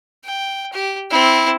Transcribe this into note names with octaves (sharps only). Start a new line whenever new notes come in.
G5
G4
C4 E4